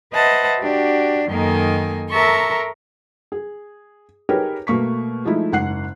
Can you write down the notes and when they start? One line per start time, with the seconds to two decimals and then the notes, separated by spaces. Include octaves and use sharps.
0.12 B4 C5 D#5 E5 F#5 A5
0.60 D4 F#4 G4
1.29 F#2 D#3 A#3 A4 D#5 G#5
2.10 A4 A#4 E5 A#5 C6 C#6
3.32 G#4
4.29 D#4 G4 G#4 A#4 B4 C#5
4.67 B2 A3 A#3 C#6 B6
5.25 F3 G#3 A3 D#4 E4
5.52 F#1 G#2 F#5 F#6 C7